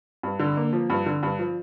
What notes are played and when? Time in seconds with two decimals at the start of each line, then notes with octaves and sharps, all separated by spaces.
0.23 G2
0.39 D3
0.57 A#3
0.73 F3
0.90 G2
1.06 D3
1.23 G2
1.39 F3